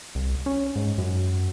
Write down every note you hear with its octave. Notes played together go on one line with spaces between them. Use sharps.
C2
C#4
G#2
F#2